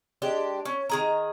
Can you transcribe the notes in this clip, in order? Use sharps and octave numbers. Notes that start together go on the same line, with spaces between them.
G#3 D4 G4 G5
C#4
D#3 G#4 A#5